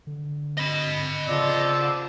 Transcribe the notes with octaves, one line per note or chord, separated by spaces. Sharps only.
D3
D#5 B5
C#3 F3 D5 E6